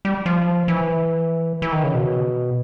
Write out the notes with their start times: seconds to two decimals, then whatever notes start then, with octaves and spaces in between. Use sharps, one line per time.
0.05 G3
0.26 F3
0.68 E3
1.62 E3
1.72 D#3
1.84 C#3
1.94 B2